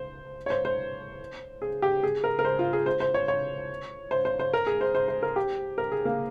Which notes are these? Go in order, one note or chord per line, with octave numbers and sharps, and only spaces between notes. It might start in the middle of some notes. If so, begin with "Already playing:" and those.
Already playing: C5
C#5
C5
C5
G#4
G4
G#4
A#4
A#4
C5
F4
G#4
C5
C5
C#5
C#5
C5
C5
C5
A#4
G#4
C5
C5
C5
A#4
G4
A#4
G#4
A#3